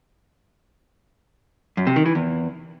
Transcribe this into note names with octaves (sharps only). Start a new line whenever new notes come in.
F#2
C3
D#3
E3
E2